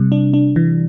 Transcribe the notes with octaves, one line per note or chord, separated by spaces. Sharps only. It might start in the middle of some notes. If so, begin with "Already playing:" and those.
Already playing: C3 G3
D4
D4
E3